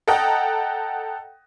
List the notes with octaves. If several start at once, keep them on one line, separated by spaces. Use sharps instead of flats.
A4 D#5 F#5 G5 A#5